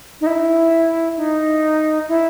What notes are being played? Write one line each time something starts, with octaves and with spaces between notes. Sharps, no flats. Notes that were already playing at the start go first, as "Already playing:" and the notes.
D#4
E4
D#4
E4